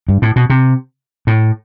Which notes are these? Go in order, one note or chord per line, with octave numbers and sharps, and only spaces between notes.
G2
A2
B2
C3
A2